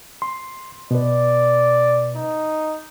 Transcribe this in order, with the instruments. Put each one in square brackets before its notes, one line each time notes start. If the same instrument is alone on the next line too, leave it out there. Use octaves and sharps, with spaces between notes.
[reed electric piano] C6
[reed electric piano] B2 B4 [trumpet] D5
[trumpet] D#4